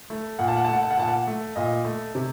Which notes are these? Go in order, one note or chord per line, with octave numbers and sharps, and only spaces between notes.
A3
A#2 F#5
A5
F#5
A3 A5
F#5
A5
F#5
A#2 A5
F#5
A3
A#2 D#5
A3
C3